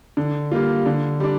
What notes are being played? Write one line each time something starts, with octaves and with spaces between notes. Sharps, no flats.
D3
G3 A#3 F4
D3
G3 D4